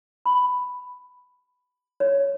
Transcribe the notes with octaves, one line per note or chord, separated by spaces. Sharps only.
B5
C#5